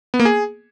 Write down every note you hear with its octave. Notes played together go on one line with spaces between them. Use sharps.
B3
A#3
G#4